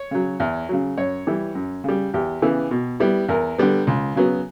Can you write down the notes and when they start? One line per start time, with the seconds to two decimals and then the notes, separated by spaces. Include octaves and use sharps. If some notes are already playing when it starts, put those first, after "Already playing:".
Already playing: C#5
0.11 C#3 F#3
0.40 E2
0.69 C#3 F#3
0.98 F#2 C#5
1.27 E3 G3
1.55 F#2
1.84 C#3 G3
2.14 E2 G4
2.42 C#3 E3 B3
2.71 B2
3.00 G3 B3 E4
3.29 E2 A#4
3.58 D3 G3 B3
3.87 C#2
4.16 C#3 F#3 B3